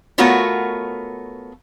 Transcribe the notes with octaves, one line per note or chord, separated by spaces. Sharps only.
A3 B3 F4 F#4 A#4 C#5